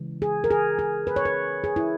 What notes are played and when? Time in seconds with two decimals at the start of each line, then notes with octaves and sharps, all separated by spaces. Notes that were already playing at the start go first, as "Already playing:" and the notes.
Already playing: C#3 E3 G#3
0.22 G#4
0.44 A#4
0.50 G#4
0.79 G#4
1.07 B4
1.16 C#5
1.25 B4
1.64 G#4
1.76 E4